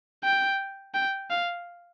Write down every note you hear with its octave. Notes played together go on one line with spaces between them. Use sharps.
G5
G5
F5